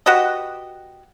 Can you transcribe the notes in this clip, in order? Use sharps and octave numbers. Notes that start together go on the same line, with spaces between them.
F#4 G4 B4 D#5